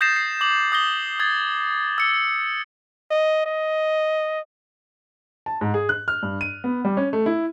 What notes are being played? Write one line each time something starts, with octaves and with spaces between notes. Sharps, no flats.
D#6 G6 A6 A#6 C7 E7
C7
D6 F#7
D#6 G6 A#6 G7
D#6 G#6 A6
E6 C#7 G7
D#5
D#5
A5
G#2
G#4
F#6
F6
G2
D#7
B3
G3
C#4
A3
E4